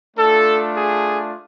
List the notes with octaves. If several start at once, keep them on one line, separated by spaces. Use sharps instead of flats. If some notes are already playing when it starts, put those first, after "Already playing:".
A3 D4 F4 A4
G#4